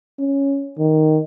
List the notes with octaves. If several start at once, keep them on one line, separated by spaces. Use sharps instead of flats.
C#4
D#3